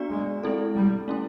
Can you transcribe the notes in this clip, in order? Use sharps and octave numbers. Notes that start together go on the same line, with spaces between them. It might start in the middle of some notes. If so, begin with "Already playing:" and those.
Already playing: B3 D4 F#4 D5
G#3
G#3 C4 E4 A4
G3
A3 C#4 E4